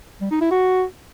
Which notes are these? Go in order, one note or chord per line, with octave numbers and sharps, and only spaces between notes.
G3
D#4
E4
F#4